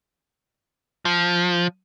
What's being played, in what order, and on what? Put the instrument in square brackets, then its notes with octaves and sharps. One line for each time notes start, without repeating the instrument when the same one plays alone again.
[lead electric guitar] F3